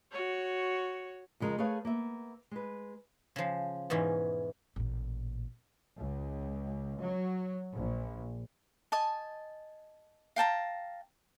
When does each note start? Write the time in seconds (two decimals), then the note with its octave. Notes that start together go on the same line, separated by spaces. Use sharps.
0.12 F#4 C#5
1.40 F2 C#3 G#3 A#4
1.58 A3 G#4 A#4 B4 C#5 F5
1.85 A#3 B3 E5
2.51 G#3 B4
3.36 C#3 F3
3.90 E2 G#2 B2 E3 C#4
4.76 A1 A#2
5.98 C#2
7.01 F#3
7.74 A#1
8.92 D#5 G#5 A5
10.36 F5 G5 A5 A#5